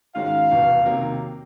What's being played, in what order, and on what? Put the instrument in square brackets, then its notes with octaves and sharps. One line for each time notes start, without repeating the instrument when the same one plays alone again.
[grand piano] G#2 D#3 G#3 C#4 F#4 [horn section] F5
[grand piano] F1 E2 B2
C3 D#3 F#3 A#3